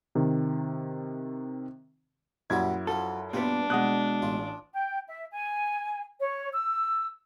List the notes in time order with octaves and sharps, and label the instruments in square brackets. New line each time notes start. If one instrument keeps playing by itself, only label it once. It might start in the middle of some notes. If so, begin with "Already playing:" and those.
[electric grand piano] C3 D#3
[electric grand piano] F#2 E4 G#6 [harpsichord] A#2 G3 F#4
[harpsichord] F3 F#3 [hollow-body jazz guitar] A4
[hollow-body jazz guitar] A#2 B3 [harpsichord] G3 A#3 [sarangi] D4
[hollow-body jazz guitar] B2 G#3 [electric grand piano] F#5 D#6 F#6
[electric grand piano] A1 [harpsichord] F4
[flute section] G5
E5
G#5
C#5
E6